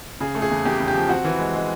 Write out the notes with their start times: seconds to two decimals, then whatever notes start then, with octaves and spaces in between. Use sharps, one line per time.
0.20 C#3 G#4
0.35 A3
0.42 G#4
0.50 E2
0.65 E2 G4
0.80 C#3
0.88 G4
0.95 F3
1.09 C4 F#4
1.25 E3
1.39 G#3
1.55 G#3